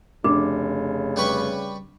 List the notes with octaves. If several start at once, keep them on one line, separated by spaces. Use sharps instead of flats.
F1 C#3 D4 D6
G3 B4 C#6